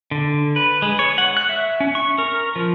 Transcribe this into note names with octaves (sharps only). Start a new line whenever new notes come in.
D3
B4
G#3
C#5
F#5
F#6
E5
C#4
C#6
A#4
F3